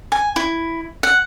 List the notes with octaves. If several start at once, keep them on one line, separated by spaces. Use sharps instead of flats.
G#5
E4
F#5